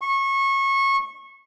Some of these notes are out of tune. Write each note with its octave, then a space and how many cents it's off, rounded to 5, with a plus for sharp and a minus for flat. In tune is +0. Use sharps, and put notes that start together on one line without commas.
C#6 -25